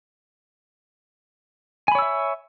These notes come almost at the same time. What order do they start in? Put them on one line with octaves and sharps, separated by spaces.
G#5 B5 C#5 E6 E5